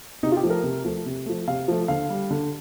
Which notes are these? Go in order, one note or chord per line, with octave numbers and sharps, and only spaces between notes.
C3 D#4
F4
G4
F3 A3
A#4
C3
F3 A3
C3
F3 A3
C3 F5
F3 A3
D3 F5
G3
D3